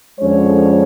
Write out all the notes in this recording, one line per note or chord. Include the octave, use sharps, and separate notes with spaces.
F2 D3 F3 G#3 C#4 C#5